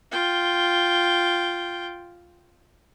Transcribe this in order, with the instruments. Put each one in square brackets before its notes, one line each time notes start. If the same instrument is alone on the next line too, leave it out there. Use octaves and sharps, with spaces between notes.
[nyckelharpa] F4 G5